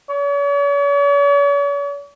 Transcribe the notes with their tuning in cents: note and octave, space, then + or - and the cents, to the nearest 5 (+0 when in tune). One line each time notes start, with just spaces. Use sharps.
C#5 +45